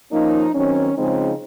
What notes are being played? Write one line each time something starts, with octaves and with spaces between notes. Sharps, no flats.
F3 A#3 C#4 D#4
D#3 F#3 C4 C#4
C#3 F3 G#3 C4 D#4